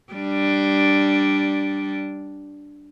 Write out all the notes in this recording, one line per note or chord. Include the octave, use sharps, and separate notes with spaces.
G3 D4